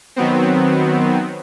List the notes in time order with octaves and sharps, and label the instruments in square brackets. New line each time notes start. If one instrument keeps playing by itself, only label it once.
[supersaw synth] D#3 F#3 B3 C4